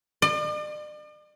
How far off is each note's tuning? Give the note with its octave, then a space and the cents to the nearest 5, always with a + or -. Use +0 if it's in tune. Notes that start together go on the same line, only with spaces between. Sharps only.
D5 +45